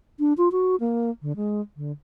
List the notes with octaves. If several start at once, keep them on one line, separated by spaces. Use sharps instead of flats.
D4
F4
F#4
A#3
D3
G#3
D3